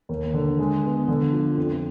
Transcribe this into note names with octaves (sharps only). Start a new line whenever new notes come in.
D#2
D3
G#3
B3
D3
F3
F2